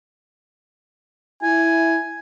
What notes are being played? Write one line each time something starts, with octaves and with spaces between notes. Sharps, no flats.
E4 G#5